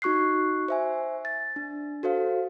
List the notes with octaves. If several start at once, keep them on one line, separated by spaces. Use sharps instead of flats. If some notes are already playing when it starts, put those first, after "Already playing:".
D#4 F#4 C#6 F#6 C7
C5 E5 G#5
A6
D4
F#4 A4 C5 F5